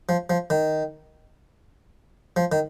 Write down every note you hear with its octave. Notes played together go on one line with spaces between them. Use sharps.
F3
F3
D#3
F3
D#3